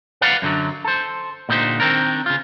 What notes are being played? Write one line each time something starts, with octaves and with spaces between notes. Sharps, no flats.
B4 D5 F5 F#5
F#2 D3 F#3
A4 C5
A#2 D3 D#4 G4 C5
D#3 C4 D4 A#4
C#3 F4